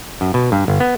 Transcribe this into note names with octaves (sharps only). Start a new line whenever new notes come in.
F#2
B2
G2
G1
B3